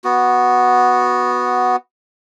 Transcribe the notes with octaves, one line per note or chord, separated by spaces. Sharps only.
B3 F#4